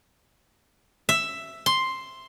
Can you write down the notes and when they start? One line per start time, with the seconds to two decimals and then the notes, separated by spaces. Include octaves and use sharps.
1.09 E5
1.66 C6